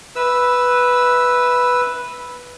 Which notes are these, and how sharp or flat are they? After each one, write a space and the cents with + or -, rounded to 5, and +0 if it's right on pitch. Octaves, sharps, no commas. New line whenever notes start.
B4 +0 E5 -15 E6 +0